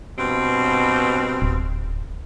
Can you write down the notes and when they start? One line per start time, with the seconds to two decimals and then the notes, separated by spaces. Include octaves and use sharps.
0.19 G2 B2 C4
1.42 D1